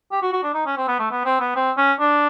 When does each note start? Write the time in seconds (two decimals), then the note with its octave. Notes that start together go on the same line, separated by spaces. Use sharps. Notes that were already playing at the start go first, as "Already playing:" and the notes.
0.11 G4
0.22 F#4
0.33 F#4
0.43 D4
0.54 D#4
0.66 C#4
0.77 C4
0.88 B3
0.99 A3
1.11 B3
1.25 C4
1.40 B3
1.56 C4
1.77 C#4
2.00 D4